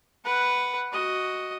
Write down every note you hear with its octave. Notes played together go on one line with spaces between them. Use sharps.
B4 F#5
F#4 D#5